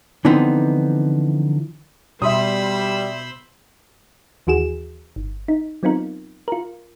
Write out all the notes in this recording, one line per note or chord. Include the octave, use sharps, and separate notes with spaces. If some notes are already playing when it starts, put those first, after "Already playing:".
D3 E3 F3 B3 C4 D#4
B2 G3 C5 E5 B5 C6 D#6 E6
D#2 E3 F#4 G#4 E7
G1
D#4
F#3 B3 C4 D#4 F4 A#4
F4 A#4